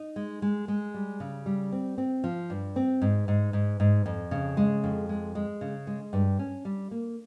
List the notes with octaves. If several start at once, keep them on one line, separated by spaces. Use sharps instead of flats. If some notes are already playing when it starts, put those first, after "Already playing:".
Already playing: D#4
G#3
G#3
G#3
G3
C#3
G3
C4
C4
F3
G2
C4
G#2
G#2
G#2
G#2
F2
C#3
G#3
F2
G#3
G#3
C#3
G#3
G2
C#4
G3
A#3